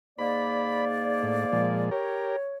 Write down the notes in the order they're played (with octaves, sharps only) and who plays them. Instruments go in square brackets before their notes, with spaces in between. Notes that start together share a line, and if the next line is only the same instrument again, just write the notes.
[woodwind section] G#2 A#3 D5 [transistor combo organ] B5
[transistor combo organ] A2
A#2 F3 G#3
[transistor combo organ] G4 A#4 [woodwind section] C#5